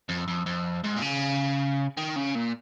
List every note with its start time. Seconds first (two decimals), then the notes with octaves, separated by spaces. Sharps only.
0.09 F2
0.28 F2
0.46 F2
0.84 G#2
0.97 A#2
1.02 C#3
1.97 D#3
2.16 C#3
2.35 A#2